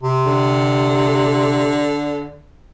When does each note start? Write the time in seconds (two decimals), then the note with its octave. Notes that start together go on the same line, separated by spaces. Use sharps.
0.03 C3
0.26 D3